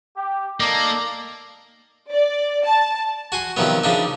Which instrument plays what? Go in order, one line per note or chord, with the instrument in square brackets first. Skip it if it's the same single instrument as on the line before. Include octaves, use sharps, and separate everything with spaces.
[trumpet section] G4
[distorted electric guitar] A#3 [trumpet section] D#4 A4 D5
[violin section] D5
A5
[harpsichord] F#4 G#5 C6
C3 D#3 F3 F#3 B3
C#3 F3 D4 D#4